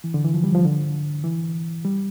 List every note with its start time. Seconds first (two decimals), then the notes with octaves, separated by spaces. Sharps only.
0.04 E3
0.14 D3
0.25 E3
0.34 F3
0.44 G3
0.55 F3
0.65 D3
1.24 E3
1.85 G3